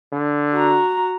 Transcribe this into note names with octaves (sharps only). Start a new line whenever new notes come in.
D3
F#4 A#5